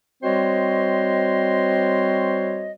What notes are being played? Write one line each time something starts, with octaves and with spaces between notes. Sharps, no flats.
G3 C4 F#4 C5 C#5 D#5